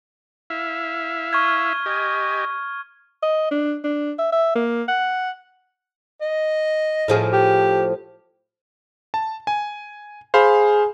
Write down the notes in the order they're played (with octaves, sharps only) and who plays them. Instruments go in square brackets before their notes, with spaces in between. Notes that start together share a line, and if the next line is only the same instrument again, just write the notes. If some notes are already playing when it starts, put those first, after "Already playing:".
[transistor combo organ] E4 E5 F5
[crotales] C#6 F6 G#6
[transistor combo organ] G4 D#5 G#5
[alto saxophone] D#5
D4
D4
E5
E5
A#3
F#5
[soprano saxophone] D#5
[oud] A2 F3 G#4
[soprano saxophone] G4
[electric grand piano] A5
G#5
[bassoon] G#4 [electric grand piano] C5 F5 B5